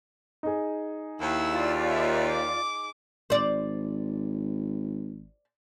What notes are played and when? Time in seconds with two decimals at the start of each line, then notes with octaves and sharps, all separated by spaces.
0.43 D#4 G#4
1.21 D#2 E4 E6
1.51 F4 D5
1.90 E5
2.28 D6
3.30 G#1 C5 D5